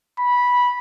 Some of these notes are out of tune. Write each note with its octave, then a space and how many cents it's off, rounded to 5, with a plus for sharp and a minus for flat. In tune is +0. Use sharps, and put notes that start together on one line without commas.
B5 -10